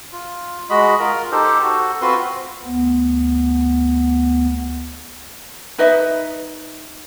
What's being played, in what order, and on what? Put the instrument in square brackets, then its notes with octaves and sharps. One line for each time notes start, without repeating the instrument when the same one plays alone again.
[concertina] F4
G#3 F#4 D#5 B5
F4 A#4
D#4 G4 A4 C5
F#4 A4
C4 F4 F#4 B4 C6
[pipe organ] D2 B3
[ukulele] D#4 B4 D#5 E5